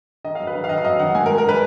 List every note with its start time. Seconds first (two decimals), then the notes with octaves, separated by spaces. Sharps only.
0.25 D#3 D#5
0.35 F#2 F5
0.47 B4
0.55 D#3
0.64 F5
0.69 D#3 D#5
0.78 F5
0.84 F#2 D#5
0.99 D#3 F#5
1.15 G#2 G#5
1.26 A#4
1.30 G#2
1.38 A#4
1.46 D#3 B4